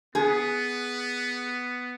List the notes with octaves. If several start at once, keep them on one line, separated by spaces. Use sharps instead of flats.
B3 G#4